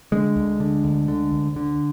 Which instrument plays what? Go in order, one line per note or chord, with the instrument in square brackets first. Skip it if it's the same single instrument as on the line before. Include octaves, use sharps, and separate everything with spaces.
[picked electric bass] D3 G#3
D2
D3
D2
D3
D2
D3